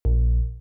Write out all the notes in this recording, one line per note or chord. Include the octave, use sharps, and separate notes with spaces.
A#1